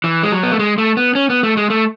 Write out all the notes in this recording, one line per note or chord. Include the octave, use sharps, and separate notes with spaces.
E3
G#3
F#3
B3
A3
G#3
A3
B3
C#4
B3
A3
G#3
A3